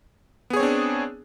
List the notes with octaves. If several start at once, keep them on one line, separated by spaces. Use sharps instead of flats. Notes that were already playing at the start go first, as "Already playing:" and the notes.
B3 C4 D4 G#4 C#5